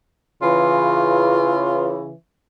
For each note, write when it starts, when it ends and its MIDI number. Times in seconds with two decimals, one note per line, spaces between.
0.42 2.11 49
0.42 2.11 52
0.42 1.96 65